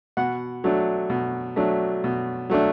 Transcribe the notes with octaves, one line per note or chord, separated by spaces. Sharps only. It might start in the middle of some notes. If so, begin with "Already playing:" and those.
B2 F#5
F#3 A3 D4
B2
F#3 A3 D4
B2
F#3 A3 D4